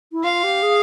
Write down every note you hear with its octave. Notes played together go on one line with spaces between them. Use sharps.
E4
F4 F5
G4
G#4